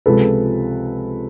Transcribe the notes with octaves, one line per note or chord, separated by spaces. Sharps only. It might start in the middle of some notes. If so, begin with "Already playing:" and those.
C#2 C3 F3 G#3 A4 B4